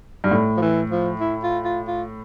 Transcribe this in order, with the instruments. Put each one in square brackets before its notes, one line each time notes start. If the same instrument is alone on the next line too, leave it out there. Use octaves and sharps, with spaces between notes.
[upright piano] G2
A2
[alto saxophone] F3
E3
F3
E4
F4
F4
F4